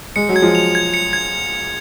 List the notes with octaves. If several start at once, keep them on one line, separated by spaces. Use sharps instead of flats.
G#3 C#7
F#3
G#6
F3 G#3
F7
G#6
C#7
G#6